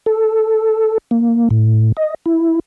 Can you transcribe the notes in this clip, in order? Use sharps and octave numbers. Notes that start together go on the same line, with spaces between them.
A4
A#3
A2
D#5
E4